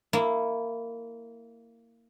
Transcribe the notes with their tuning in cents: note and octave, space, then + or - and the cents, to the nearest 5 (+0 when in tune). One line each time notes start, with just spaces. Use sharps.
A#3 -15 E4 +0